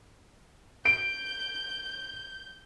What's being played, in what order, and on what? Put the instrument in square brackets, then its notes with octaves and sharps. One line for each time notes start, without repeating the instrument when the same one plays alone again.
[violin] G6 [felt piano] D7